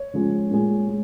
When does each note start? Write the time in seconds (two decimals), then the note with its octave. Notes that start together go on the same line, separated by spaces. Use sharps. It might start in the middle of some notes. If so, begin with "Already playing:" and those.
Already playing: C#5
0.13 C#3 F3 G#3
0.51 A#2 G#3
0.88 G#3